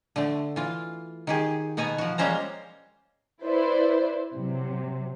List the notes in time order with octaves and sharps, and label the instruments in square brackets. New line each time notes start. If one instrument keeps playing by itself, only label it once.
[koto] D3 A3
E3 F4
D#3 G4 G#4
B2 B3 F#4 F#5 G#5 A#5
F3 F#4
G3 G#3 A#3 C#4 C5 A#5
[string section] E4 B4 C5 D5
C3 F#3